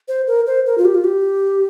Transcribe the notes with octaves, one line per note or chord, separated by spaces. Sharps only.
C5
A#4
C5
A#4
F4
G4
F4
G4